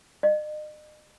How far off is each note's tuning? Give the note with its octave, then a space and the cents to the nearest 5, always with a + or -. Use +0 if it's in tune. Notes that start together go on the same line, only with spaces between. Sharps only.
D#5 -40